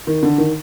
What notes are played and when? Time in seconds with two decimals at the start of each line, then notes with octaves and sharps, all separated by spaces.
0.07 D#3
0.23 D3
0.38 D#3